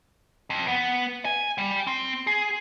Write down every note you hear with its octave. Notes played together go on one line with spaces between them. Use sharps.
F2
B3
G#5
G3
C4
G#4